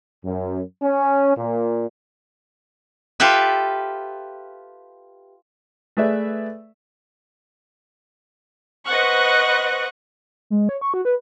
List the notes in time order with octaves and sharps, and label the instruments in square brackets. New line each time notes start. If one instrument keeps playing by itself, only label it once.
[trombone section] F#2
C#4
A#2
[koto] F4 G4 A4 B4 E5
[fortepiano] A3 G#4 B4 D5 E5
[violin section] B4 C5 D#5 F#5 C#6 F#6
[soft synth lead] G#3
C#5
C#6
F#4
B4